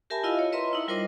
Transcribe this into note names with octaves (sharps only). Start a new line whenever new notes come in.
G4 A#4 E5 G#5 A5 B5
E4 F4 D#5 F5
C#5
B4 C#5 D#5 E5 A#5 C6
D#4 E4
G3 F4 A#4 C5 D#5 D6